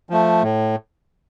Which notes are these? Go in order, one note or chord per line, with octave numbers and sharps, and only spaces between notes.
F3 A3
A2